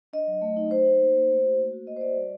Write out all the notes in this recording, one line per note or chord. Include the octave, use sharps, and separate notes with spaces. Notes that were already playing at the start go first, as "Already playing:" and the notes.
D4 D#5
F#3
A3
D#4
D#4 C5
D#4
A#3
A#3
A3
F#4
A#3
F#4
A#3 D#5
C5
F#4 D5
G3